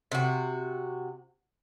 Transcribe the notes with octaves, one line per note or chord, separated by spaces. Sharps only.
C3 F#4